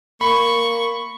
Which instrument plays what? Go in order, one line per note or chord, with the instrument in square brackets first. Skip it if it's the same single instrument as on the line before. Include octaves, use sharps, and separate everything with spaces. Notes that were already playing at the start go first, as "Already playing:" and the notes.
[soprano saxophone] A#3 [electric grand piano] B5 [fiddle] C#6